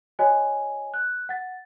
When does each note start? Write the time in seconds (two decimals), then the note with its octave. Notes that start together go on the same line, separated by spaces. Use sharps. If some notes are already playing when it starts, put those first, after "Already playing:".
0.19 F#4 C#5 D#5 G#5
0.94 F#6
1.29 F#5 A6